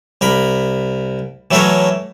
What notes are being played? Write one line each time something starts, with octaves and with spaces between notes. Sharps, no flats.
C2 A#4 B5
E3 F#3 A3 A4 A#4 C#5